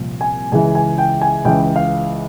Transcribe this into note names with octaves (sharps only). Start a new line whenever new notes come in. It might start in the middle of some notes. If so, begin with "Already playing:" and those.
Already playing: C2 A#2 F3
G#5
C#2 C#3 E3 G#5
G#5
G5
G#5
C#2 C#3 E3 G5
F5